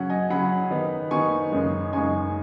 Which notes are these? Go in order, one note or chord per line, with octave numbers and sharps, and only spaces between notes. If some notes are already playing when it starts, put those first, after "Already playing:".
Already playing: C#3 F#3 C#4 C#5 F#5
D#5 G#5
C#3 F#3 C#4 F#5 B5
D#3 B3 D#4
D#3 B3 D#4 G#5 C#6
F#2 C#3 G#3 D#4
F#2 C#3 G#3 D#4 G#5 C#6